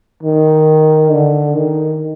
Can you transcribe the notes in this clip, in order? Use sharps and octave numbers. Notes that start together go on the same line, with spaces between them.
D#3
D3
D#3